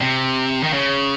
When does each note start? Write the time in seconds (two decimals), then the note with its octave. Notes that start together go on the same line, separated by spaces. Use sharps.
0.01 C3
0.63 D#3
0.73 C#3